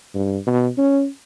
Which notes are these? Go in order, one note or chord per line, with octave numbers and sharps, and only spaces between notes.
G2
B2
C#4